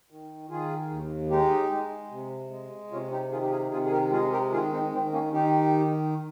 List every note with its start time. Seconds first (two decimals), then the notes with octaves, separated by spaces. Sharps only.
0.10 D#3
0.50 D#3 F4 G#4
0.90 D#2
1.30 G#3 D#4 G4
1.71 G#3
2.11 C3
2.51 G#3
2.91 C3 C#4 F4
3.11 D#4 G4
3.32 D#3 F4 G#4
3.42 G4
3.51 F4 G#4
3.72 C3 F4 G#4
3.85 G#4
3.92 G4 A#4
4.12 G#3 F4 G#4
4.32 G4 A#4
4.52 D#3 F4 G#4
4.73 C4 D#4
4.93 D#3 C4
5.12 A#3 C#4
5.33 D#3 D#4 G4